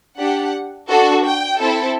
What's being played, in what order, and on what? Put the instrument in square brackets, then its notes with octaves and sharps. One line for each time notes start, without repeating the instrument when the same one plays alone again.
[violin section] D4 G4 F#5
D4 F#4 A4
G5
C4 E4 A4